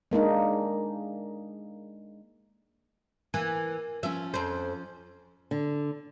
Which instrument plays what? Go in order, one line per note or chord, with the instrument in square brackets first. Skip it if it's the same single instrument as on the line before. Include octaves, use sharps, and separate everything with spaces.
[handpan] G#3 A#3 D4 D#4
[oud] E3 [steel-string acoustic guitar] A#3
[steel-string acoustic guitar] F3 C#4 [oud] E5
[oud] F2 C5
[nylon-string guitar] D3